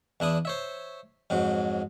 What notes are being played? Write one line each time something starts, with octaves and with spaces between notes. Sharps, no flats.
E2 D4 E4 D#6
C5 C#5 E5
F2 G#2 F#3